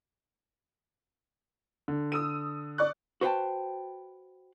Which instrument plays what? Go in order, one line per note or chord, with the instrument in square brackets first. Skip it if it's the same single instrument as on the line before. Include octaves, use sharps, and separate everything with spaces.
[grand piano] D3
[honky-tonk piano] D#6 E6 D#7
D5 C#6 F#6
[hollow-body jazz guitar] F#4 B4 C5 F#5 G5 A5